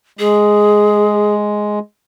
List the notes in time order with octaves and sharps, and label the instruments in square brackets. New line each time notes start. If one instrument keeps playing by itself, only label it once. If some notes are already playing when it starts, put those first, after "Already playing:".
[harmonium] G#3 [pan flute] G#4